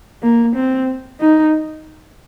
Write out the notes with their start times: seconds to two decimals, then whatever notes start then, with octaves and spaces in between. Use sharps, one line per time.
0.22 A#3
0.56 C4
1.21 D#4